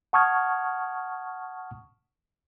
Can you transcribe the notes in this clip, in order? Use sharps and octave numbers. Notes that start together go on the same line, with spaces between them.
F#5 A5 C#6 D#6 F6 G#6